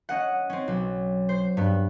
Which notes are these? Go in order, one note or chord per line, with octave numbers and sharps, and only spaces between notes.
C#4 D#5 F#5
C4 C#4
B1
C5
G2 B3